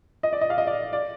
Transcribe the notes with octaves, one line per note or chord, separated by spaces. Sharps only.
D#5
D5
D#5
F5
D#5
D5
D5